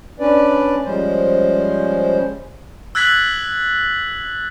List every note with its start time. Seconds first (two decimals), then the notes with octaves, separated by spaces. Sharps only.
0.20 C#4 D4 B4 D5
0.85 F3 G3 G#3 C#4 C5
2.95 E6 F#6 G#6 A6 B6 F#7